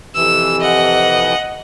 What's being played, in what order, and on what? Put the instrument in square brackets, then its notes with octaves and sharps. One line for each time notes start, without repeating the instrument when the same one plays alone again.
[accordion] F2 C3 E3 [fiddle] E6
[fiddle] D#5 F#5